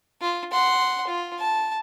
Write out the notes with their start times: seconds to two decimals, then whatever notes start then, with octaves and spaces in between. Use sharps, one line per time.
0.21 F4
0.52 F#5 C6
1.08 F4
1.39 A5